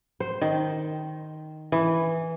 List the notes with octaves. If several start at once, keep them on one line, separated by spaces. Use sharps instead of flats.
C5
D#3
E3